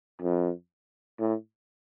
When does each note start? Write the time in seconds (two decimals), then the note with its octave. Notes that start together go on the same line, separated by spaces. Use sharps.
0.22 F2
1.19 A2